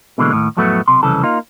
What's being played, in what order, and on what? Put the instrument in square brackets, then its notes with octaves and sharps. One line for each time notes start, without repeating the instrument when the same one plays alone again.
[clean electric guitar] B2 D3 E3 G#3 A#3
D#2 A2
F2 A2 F#3 A3 B3
B1 C3 C6
C2 F2 C#3 E3 A4
A#3 D#4 F4